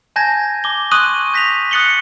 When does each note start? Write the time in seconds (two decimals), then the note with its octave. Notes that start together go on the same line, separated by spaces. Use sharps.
0.16 G#5 A5 G6 G#6 A#6
0.64 D6 G7
0.91 C6 C#6 D#6 F#6 D#7 F#7
1.34 G6 A#6 B6 D#7 F7
1.71 D#6 F#6 A6 C#7 F#7 G7